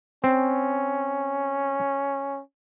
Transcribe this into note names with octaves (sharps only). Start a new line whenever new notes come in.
C4 C#4